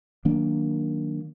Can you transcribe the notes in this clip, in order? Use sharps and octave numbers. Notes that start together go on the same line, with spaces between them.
D#3 F#3 A#3 D4